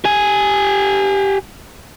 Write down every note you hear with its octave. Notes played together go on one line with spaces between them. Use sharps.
G4 G#5